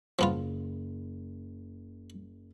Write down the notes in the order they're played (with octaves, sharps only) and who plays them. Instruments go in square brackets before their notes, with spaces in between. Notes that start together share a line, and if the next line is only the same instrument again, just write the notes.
[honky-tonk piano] F#1 [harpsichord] F3 B3 F4